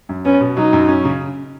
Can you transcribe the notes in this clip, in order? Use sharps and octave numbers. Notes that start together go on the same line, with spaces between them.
F#2
B3 C#4
B2
F#3 D#4
F#2
C#4
C#3